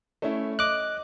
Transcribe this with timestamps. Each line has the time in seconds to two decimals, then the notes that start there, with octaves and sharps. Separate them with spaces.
0.22 A3 C#4 E4
0.59 D#5 D6 F#6